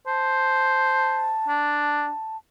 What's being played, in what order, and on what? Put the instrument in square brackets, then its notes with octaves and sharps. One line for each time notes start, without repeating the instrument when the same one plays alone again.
[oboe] C5 [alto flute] A5
[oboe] D4